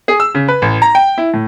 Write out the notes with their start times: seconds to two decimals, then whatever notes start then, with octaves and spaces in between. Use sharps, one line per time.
0.08 G#4
0.20 E6
0.35 C#3
0.48 B4
0.62 A1
0.82 A#5
0.95 G5
1.18 E4
1.34 A2